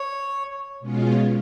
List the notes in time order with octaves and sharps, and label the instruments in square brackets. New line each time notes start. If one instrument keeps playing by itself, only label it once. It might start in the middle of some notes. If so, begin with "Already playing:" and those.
Already playing: [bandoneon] C#5
[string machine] B2 G#3 C#4 F4